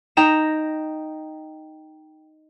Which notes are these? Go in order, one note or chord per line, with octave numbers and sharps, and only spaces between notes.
D#4 G5 A#5 E7